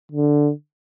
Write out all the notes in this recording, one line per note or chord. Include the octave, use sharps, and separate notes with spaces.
D3